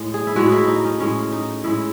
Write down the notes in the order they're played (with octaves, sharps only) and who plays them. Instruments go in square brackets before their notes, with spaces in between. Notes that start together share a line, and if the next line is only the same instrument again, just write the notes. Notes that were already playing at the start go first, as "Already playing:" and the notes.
Already playing: [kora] A2 G#3
G#4
E4
A2 G#3 F#4
E4
D#4
C#4
A2 G#3 C#4
D#4
A2 G#3 E4